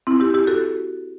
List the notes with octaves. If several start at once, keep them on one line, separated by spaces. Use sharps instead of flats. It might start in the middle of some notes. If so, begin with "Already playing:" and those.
C4 E4
E4 G4
E4 G4
F#4 A4